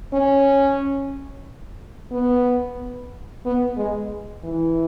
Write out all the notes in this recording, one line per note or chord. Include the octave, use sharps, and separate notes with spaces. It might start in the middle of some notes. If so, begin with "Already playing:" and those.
C#4
B3
B3
G#3
E3